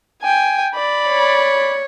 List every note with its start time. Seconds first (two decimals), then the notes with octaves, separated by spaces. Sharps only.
0.22 G5 G#5
0.74 D5 B5
1.09 C#5